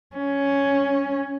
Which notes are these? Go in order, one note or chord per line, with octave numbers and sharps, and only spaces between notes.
C#4